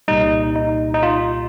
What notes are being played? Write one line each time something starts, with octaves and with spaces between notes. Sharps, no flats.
C2 A#2 G3 D#4
D#4
D#4
F4